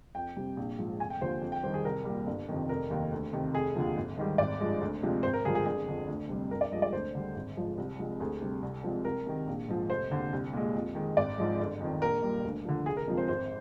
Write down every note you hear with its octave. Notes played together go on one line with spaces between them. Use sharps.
F2 G5
C3 G3
A#1
G#2 F3 G#3
F1 G#5
G5
D#2 D3 F3 C5
F2
G5
D#3 G3 C5
G#4
C2 A#4
A#2 G3
G1
F2 C3 D#3
F1 A#4
D#2 D#3
D2
C3 D#3
F1 G#4
D#2 D3 F3
G#1
G#2 D#3 G3
G#1 D5
G2 F3 G#3
D2
C3 F3 G#3
G#1 C5
A#4
G2 D3 F3 G#3 G#4
G#4
G1 G#4
F2 D3
D2
C3 G3
G1 A#4
D5
G2 F3 G#3 D#5
D5
D2 C5
D3 G3
G#1
G#2 F3 G#3
C2
C3 F3 G#3
D2 G#4
C3 G3
C2
C3 F3 G#3
C2 A#4
C3 D#3
A#1
G#2 F3 G#3
F1 C5
D#2 D3
C2
A#2 G#3
F2
D#3 G#3
G#1 D5
G#2 F3 G#3
G1
F2 D#3
A#1 A#4
A#2 G3
D2
D3 F3
F1 G#4
A#4
F2 C3 F3 G#3
C5
G#1 C5